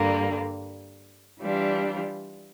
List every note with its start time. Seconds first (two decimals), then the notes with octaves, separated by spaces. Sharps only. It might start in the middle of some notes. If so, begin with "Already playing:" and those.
Already playing: G2 D3 G3 A#3
1.40 E3 G3 D4 F4